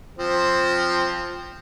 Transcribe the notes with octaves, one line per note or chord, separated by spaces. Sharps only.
F3 C4